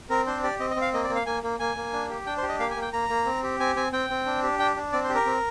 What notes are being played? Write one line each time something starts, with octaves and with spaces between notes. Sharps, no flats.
C4 A#4
D4 C5
G4 D5
C4 D#5
D#5
C4
F5
A#3 D#5
D5
A#3
F5
A#3 G#5
A#3
A#3 G#5
A#3
D4
G4
D4 G5
C5
G4
D#5
A#3 F5
G#5
A#3
G5
A#3 A#5
A#3
C4
G4
C4 G#5
C4 G#5
C4 G5
C4
D4
G4
D4 G5
D4
C4 D5
C5
G4
A#4
C4